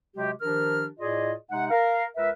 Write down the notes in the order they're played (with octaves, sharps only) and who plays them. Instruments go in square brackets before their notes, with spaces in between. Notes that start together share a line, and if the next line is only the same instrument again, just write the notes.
[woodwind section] C3 F#3 G#3 F#4 G4
D#3 F3 D4 G4 A#4 F6
A2 F4 G#4 D5 D#5
C3 G#3 D#4 F#5
A#4 F5
C#2 A#4 B4 E5